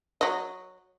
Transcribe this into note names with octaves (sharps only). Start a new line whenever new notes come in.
F#3 D#5